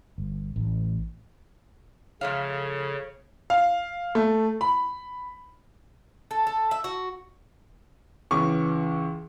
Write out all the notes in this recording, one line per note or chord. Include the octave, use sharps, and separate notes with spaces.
G1
A1
C#3 F3 A3 C#5 F5
F5
A3
B5
A4
A4
E5
F#4
C#2 E3 C#4 C#6 D6